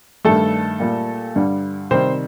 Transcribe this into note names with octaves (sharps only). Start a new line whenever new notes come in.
G2 D#3 G3 A3 A4
A#2 G3
G2 D3 G3
C3 D#3 G3 C4 C5